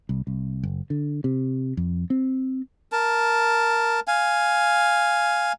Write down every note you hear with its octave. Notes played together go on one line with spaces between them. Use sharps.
C2
C2
F#1
D3
C3
F2
C4
A#4 A5
F5 G#5